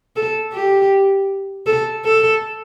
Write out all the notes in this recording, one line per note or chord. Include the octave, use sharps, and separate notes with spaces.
A4
G4
A4
A4